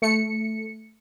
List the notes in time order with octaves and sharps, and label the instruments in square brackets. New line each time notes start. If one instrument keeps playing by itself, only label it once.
[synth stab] A3 C#7